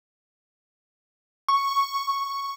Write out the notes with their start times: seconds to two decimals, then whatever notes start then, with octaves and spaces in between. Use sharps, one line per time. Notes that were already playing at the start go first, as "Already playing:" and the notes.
1.48 C#6